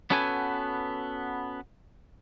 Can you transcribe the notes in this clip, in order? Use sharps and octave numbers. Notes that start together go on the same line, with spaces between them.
B3 C#4 F#4 A4 B4 G#5